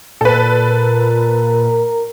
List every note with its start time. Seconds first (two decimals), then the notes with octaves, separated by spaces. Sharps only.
0.21 A#2 A4 B4
0.68 A#4